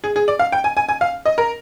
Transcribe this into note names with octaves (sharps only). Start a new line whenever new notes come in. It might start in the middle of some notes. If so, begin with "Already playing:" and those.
G#4
G#4
D5
F5
G5
G#5
G#5
G#5
F5
D#5
A#4